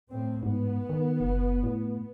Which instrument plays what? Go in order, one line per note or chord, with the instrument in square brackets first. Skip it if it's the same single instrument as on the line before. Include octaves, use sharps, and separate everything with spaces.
[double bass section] A2 C4
[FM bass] G#2 [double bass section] B3
[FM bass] D#3
F#1
A2